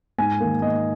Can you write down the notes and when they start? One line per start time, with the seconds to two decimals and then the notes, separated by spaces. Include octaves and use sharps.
0.18 G#2 G#5
0.40 D#3 A#3
0.62 G#2 D#5